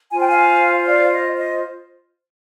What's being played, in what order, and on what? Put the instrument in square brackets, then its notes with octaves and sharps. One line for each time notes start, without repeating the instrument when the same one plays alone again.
[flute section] F4 C5 G#5
G5
F5 G#5
D5 F5
D#5
D#5